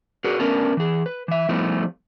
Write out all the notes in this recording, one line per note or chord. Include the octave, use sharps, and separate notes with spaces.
F#4 G#4 A#4 B4 D5
A3 B3 C#4 D4 A#4 B4
E3 G#4
B4
E3 E5
F3 G3 A3 B3 D#4 E4